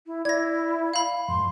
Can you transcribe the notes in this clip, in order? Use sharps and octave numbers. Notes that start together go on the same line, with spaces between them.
E4
E4 D5 G#6 A#6
F5 B5
F2 G#2 C6